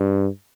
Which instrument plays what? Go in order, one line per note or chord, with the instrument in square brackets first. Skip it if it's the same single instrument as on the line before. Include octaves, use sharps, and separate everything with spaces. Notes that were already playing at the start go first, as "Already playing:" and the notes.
Already playing: [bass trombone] G2